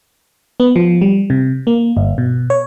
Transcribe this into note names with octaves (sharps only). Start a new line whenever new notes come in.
B3
F3
G3
C3
A#3
G1
B2
C#5